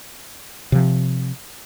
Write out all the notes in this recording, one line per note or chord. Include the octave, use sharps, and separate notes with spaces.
C3 F3